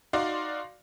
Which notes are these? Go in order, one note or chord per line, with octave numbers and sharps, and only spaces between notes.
D#4 F#4 D5 F5 C6 D6